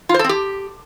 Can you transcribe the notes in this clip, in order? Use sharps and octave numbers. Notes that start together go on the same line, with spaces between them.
F4
C5
A4
C4
G4